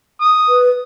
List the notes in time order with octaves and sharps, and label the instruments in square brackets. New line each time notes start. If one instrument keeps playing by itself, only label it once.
[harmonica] D#6
[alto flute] B4